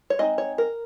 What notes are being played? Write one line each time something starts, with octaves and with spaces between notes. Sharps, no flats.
C#5
G#3 C4 D#4 D#5
C#5
A#4